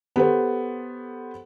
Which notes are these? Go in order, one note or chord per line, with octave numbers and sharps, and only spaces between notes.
B3 G4 A4 C5